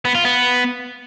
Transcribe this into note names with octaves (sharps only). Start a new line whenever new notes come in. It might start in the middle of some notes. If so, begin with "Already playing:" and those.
B3
F4
B3